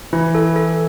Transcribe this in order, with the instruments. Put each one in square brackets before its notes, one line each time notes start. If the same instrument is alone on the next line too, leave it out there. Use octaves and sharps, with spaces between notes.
[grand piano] E3 [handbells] E4
[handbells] A4
A4